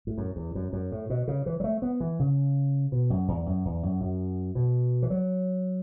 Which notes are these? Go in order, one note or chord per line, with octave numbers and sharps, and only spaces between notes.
A2
F#2
E2
F#2
F#2
A2
B2
C#3
E3
F#3
A3
B3
E3
C#3
B2
F#2
E2
F#2
E2
F#2
F#2
B2
E3
F#3